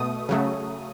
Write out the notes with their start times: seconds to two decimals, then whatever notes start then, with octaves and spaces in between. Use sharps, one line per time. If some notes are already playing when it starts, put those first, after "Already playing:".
Already playing: B2 A3 D#6
0.29 C#3 F#3 A3